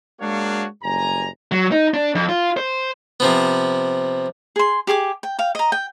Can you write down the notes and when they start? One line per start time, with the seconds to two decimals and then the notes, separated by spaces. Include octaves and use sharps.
0.20 G#3 A#3 D4 F#4 C#5 F5
0.82 F#1 G2 G#5 A#5
1.52 F#3
1.72 D#4
1.94 D4
2.15 F2
2.29 F4
2.57 C5
3.20 C3 F3 B3
4.56 G#4 C6
4.87 G4 G#4 C#6 D6
5.23 G5
5.39 F5 G5
5.55 D#5 A#5
5.72 G5